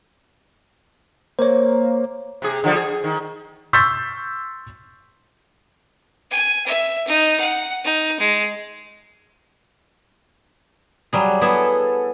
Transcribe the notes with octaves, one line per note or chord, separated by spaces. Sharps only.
A#3 C5 C#5
C3 G#4
D3 F3 G3
G#4
D#3
C6 C#6 E6 G6 A6 B6
G#5
E5
D#4
F#5
D#4
G#3
F#3 G3 G#4
B3 E4 G#4 A4